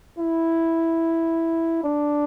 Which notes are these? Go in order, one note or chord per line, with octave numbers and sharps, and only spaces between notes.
E4
D4